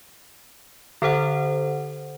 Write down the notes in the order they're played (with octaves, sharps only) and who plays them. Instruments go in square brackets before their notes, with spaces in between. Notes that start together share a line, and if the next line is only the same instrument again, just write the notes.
[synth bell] D3 A4 C5 F#5